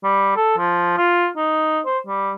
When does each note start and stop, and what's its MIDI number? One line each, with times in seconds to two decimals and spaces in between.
0.04 0.34 55
0.36 0.57 69
0.58 0.93 53
0.97 1.28 65
1.36 1.80 63
1.86 1.98 72
2.06 2.34 55